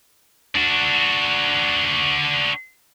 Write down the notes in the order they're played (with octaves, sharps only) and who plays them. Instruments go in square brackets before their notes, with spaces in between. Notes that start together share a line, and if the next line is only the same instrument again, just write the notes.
[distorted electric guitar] D4 F#4